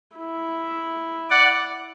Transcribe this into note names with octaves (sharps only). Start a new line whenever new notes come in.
E4
D5 F#5